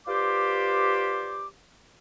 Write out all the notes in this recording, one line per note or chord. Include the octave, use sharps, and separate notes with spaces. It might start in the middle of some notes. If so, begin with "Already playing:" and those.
F4 G4 B4 C5 D5 D6